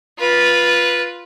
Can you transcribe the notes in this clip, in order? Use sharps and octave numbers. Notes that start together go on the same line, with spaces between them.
F4 B4